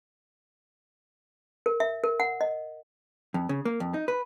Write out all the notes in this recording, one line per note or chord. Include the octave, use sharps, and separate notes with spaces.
A#4
E5
A#4
F#5
D#5
F2
C#3
A#3
F2
D#4
B4